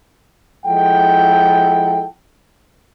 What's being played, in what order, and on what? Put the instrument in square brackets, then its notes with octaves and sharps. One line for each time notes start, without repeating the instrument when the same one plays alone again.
[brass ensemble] F3 G#3 E4 A4 F#5 G5